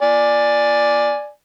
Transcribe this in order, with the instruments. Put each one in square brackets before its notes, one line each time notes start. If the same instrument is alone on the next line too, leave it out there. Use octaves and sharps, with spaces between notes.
[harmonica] D5 G#5